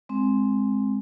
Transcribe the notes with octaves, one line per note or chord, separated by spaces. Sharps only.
G#3 C4